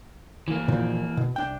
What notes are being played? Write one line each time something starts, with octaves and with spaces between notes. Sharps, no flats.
E3 A#3
A#2 D#3 F3
B2
C2 D4 G5